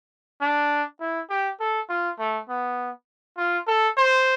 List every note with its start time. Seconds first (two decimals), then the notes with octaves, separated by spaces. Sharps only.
0.41 D4
1.00 E4
1.30 G4
1.60 A4
1.89 F4
2.19 A3
2.49 B3
3.37 F4
3.67 A4
3.97 C5